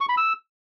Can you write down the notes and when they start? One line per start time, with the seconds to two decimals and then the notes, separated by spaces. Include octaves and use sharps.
0.01 C#6
0.09 B5
0.17 E6